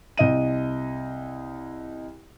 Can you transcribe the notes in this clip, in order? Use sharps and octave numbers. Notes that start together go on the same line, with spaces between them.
C2 D#5 D#7